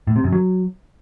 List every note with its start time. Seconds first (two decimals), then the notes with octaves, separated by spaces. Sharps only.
0.07 A2
0.16 C3
0.24 F#2
0.32 F#3